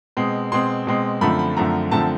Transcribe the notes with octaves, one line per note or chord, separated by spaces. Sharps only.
B2 G#3 C4
B2 G#3 C4 C6
B2 G#3 C4
F#2 D3 F3 A3 C4 B5
B5
F#2 D3 F3 A3 C4 A#5
F#2 D3 F3 A3 C4 A5